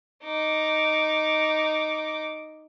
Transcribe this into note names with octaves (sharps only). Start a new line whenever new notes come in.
D#4 D6